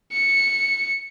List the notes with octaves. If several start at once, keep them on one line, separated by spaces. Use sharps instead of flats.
C#7